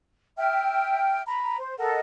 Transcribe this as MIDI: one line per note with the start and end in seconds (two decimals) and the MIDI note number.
0.38 1.22 76
0.38 1.22 79
0.38 1.22 89
1.26 1.56 82
1.26 1.56 83
1.57 1.76 72
1.78 2.00 69
1.78 2.00 70
1.78 2.00 75
1.78 2.00 78